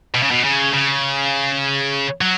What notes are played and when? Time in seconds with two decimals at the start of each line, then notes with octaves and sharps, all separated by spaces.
0.15 B2
0.23 C#3
0.31 B2
0.44 C#3
0.74 C#3
2.21 F#3